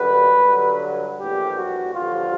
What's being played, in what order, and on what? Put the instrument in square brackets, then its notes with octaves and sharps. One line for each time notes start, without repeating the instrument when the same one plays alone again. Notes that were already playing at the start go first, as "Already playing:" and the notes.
Already playing: [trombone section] F#2 D3 G3 B4
G2 D3 F#3
A#1 A2 E3 G3 G4
F#4
A1 G2 D3 F3 F4